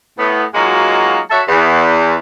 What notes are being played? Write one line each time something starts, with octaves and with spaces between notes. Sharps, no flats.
A2 B3
F#3 G#3 A#3 D#4 F4 F#4
F#4 A4 C#5 E5
E2